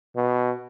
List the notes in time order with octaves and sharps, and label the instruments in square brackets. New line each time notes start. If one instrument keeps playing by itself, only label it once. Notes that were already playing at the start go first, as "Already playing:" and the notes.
[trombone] B2